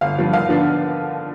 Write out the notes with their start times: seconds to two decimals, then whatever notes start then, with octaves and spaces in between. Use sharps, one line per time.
0.01 G1 F5
0.17 G2 F3 B3
0.33 D#2 F5
0.49 D3 F3 B3 D4